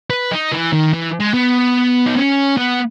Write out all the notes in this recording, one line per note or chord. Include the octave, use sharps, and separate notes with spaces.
B4
D#4
E3
D#3
E3
G#3
B3
D#4
C#4
B3